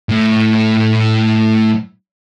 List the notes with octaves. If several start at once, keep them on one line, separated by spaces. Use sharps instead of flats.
A2 A3